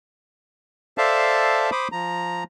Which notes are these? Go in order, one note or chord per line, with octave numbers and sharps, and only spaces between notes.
A4 C5 D5 E5 F5 A5
C5 B5 D6 D#6
F3 A#5